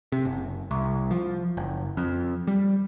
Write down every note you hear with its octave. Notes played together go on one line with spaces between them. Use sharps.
C3
F#1
C2
F3
F#1
F2
G3